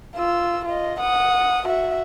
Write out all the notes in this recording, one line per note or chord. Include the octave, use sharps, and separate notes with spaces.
F4 E6
F4 D#5
F#5 D#6
F#4 E5